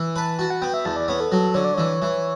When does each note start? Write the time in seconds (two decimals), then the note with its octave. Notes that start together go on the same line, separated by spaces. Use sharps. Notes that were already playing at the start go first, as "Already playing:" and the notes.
Already playing: E3
0.16 B4 A5
0.38 F#4 A5
0.50 F#5
0.62 B3 G5
0.74 E5
0.85 E2 A5
0.96 D5
1.08 B3 C#5
1.20 A4
1.32 F#3 A4
1.54 D3 C#5
1.65 D5
1.74 E3 C#5
2.02 E3